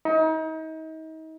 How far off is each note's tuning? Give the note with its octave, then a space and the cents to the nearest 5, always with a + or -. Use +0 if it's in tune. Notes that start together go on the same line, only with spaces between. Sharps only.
D#4 +35